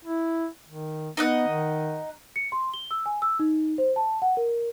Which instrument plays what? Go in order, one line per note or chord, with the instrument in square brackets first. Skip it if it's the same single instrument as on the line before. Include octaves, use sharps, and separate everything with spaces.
[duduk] E4
D#3
[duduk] B3 [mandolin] D#4 D#5 F#5
[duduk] D#3
[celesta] C#7
C6
G7
E6
G#5
E6
D#4
C5
A5
F#5
A#4